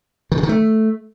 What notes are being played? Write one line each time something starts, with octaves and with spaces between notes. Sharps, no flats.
D#3
C#3
D#3
A3